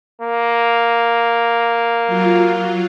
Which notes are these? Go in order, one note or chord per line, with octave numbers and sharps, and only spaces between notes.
A#3
F#3 F4